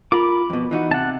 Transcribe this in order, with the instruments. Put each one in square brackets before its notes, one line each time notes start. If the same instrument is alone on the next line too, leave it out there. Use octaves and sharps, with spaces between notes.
[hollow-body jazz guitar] F4 A#4 [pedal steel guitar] B5 D6
[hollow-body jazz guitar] F2 B2
E3 D#4 F#4
[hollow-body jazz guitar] C3 [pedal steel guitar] F#5 A5